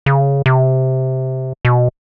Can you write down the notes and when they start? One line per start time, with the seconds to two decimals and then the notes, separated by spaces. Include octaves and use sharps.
0.06 C#3
0.46 C3
1.65 B2